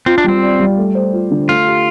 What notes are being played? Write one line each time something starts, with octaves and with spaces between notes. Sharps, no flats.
C4 F4
D4
G3 C4
D5
G3
A3
C5
F4
D3
A3 F4
G4